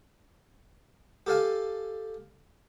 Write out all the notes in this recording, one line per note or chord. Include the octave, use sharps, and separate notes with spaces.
G4 A4 F5 G#5